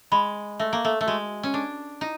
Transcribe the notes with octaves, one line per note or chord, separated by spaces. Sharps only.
G#3 B5
A3 E5
A#3
A3
A3
G#3 F#4
C#4
D4 A4
D#4 E4